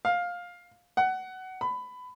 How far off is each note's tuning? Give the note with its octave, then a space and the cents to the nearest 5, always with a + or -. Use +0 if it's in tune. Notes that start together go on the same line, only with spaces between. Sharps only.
F5 +15
F#5 +20
B5 +20